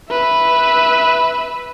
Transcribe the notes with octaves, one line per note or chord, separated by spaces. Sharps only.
B4 E5